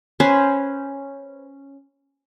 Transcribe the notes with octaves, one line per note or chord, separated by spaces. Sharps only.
C#4 B4 C5